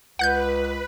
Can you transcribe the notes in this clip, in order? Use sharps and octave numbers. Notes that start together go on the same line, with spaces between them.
C#2 B4 F#5 F#6 G6